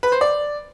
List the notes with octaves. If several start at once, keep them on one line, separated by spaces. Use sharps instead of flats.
B4
C5
D5